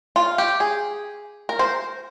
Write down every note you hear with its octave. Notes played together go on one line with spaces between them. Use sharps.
F4
G4
G#4
A#4
C5